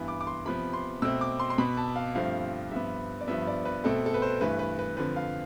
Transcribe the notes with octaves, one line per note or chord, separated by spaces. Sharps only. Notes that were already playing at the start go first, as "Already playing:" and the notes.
Already playing: G2 E3 B3
D6
D6
C6
C3 F3 B3 B5
C6
B2 A3 C4 E6
D6
C6
C6
B2 B3 B5
A5
F5
G2 F3 A3 C4 F5
G2 F3 B3 E5
D5
G2 F3 B3 E5
D5
B4
B2 A3 C4 A4
A4
B4
C5
G2 E3 A3 B4
B4
B4
F2 D3 F3 B4
F5